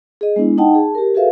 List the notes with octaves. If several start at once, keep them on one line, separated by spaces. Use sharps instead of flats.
G#4 D#5
G#3 B3 D4 E4
D#4 D#5 F#5 G5 A5
G#4 A5
G4 A#4
F#4 G#4 A4 B4 E5 F5